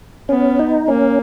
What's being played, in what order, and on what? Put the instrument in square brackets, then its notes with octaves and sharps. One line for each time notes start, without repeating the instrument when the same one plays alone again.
[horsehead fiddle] B3 [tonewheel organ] C#4
[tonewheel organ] D#4
[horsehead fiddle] A#3 [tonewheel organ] C#4